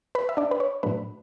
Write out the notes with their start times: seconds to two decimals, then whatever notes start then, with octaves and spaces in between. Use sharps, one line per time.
0.15 B4 B5
0.29 E5
0.37 D4 D5
0.51 B4
0.60 C#5
0.83 A2 F#3 A3 D4 B4